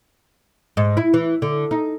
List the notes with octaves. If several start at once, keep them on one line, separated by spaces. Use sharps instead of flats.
G#2
E4
E3
D3
D#4